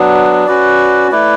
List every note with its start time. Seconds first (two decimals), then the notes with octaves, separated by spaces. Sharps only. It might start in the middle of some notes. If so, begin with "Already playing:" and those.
Already playing: F#3 B3 D4
0.46 C#4 F#4 B4 D5
1.12 A3 E4 B4 D5